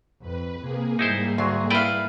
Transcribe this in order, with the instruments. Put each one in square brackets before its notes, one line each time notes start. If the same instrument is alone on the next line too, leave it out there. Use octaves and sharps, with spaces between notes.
[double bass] F2 [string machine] B4
[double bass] C3 [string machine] A#3 G#4
[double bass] G#2 G3 [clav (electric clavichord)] D#4 E4 C5
[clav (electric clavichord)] D2 F#3 [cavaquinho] C6
[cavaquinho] E4 F5 [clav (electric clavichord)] B4 D5 G5